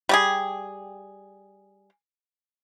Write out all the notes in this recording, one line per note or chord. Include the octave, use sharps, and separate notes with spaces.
G3 G4 G#4